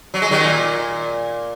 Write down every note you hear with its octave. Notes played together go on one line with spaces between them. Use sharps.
F#3
G#3
D#3 F#3
A#2